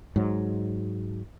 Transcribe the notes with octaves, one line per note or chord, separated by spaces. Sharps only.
G#2 F#3